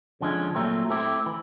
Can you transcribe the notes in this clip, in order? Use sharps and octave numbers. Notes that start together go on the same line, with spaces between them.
F2 D3 F3 G#3 C#4
A#2 F#3 A3 C4
A3 C4 E4 G4
E3